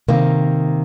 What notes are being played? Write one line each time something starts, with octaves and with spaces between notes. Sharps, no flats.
C3 D#3 A#3